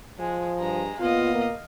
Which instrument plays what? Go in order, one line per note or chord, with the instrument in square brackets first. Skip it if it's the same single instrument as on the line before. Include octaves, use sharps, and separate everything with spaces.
[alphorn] F3 [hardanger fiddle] G#3
[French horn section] G2 [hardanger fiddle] G#3 A#5
[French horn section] A#2 B3 [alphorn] F4 [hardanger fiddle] D#5 F5
[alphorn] A#3